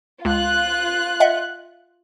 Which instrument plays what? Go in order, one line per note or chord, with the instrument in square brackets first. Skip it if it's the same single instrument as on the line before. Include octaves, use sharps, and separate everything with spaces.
[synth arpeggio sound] C#2 [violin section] F4 F#6
[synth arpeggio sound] D#5 E5 F#5